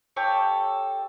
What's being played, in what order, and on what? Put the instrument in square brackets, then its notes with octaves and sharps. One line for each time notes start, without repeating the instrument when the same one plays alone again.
[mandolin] G4 A4 C#5